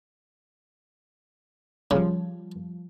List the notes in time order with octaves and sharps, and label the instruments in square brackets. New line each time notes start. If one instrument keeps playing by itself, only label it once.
[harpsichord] C#3 [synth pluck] F3 G3